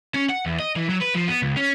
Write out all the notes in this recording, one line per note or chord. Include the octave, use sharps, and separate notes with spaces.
C#4
F#5
E2
D#5
E3
F#3
B4
F3
B3
C#2
C#4